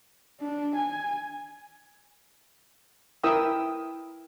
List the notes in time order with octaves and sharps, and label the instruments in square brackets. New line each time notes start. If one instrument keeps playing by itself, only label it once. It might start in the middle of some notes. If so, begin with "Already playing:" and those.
[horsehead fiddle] D4
G#5
[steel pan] E4 A#4 E5 G5 D#6 E6